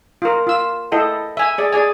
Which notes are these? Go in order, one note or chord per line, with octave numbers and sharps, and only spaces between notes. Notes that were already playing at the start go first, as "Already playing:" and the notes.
F4 A#4
F4 E6
E4 A4 D#5 G5
E5 G#5
G#4 D5
G#4 D5 G#5